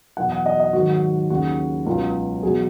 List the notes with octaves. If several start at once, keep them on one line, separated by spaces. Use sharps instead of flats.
E2 B2 F#3 F#5
F#5
D#5
D#5
G#2 D#3 F#3 F#4
D#2 C#3 F#3 F#4
C#2 B2 F#3
E2 B2 F#3 G#4